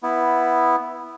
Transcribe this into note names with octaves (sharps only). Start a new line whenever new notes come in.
B3 E4